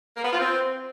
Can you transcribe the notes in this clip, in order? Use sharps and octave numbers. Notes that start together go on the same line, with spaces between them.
A#3
B3
F4
C4